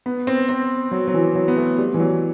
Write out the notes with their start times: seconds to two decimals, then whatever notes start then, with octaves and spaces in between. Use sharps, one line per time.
0.06 B3
0.27 C4
0.49 C4
0.91 F#3
1.08 F#3
1.14 E3
1.35 F#3
1.48 B3
1.57 A3
1.78 G3
1.94 E3
2.00 F#3